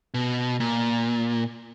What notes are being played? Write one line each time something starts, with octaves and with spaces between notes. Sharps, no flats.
B2
A#2